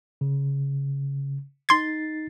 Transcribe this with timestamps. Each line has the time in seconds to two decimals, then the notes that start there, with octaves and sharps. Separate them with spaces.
0.21 C#3
1.69 D#4 C6 G#6 A6 C7